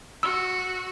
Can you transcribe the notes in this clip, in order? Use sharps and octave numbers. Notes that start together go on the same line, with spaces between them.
F#4 E6